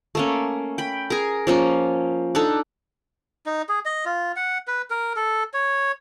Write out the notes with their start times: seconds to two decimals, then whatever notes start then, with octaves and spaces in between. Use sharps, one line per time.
0.15 A3 A#3 C#4
0.78 G5 B5
1.10 G#4 A#4
1.47 F3 A#3 C#4
2.35 D4 D#4 A4
3.46 D#4
3.69 G#4
3.85 D#5
4.06 F4
4.36 F#5
4.68 B4
4.90 A#4
5.16 A4
5.54 C#5